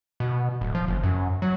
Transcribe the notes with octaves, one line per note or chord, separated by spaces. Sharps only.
B2
D1
F3
F#1
F#2
F#3